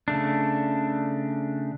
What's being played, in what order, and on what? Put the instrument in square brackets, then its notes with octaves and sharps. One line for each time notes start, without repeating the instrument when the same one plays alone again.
[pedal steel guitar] C#3 A3 D4